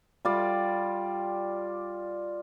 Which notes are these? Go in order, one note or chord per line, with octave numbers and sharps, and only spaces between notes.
G3 F4 D5